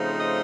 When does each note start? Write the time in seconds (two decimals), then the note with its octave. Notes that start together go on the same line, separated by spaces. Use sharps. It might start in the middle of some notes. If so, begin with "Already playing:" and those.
Already playing: C#3 F3 A3 C4 D#4
0.18 D#5